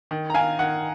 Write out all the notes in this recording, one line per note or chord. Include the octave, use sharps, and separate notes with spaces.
D#3
A#5
F5 G#5
D#3 F#5